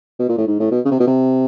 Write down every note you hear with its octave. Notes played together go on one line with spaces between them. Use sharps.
B2
A#2
A2
G#2
A2
B2
C#3
C3
B2
C3